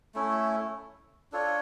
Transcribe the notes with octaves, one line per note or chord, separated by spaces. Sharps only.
A3 C#4 E4
D4 F4 A4 C#5